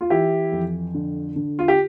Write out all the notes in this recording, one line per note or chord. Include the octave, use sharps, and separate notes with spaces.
F4
E3 E4 G4
F2
D3
D3
F4
G4